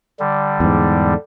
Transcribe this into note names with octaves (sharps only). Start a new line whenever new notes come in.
D3 G3
E2 G#2